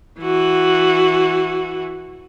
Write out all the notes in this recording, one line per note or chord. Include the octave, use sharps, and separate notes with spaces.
E3 F#4